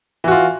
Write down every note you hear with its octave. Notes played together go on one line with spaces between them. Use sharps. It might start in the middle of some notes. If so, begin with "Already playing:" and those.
E3 F4 F#4